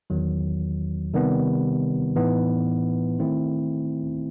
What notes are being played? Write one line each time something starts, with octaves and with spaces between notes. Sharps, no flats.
E2 D#3 F#3
C3 D#3 G3 B3
A2 E3 B3 D#4
D#3 A3 C4 E4